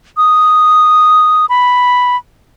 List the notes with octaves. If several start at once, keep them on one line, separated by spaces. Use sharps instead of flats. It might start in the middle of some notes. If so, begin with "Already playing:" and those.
D#6
B5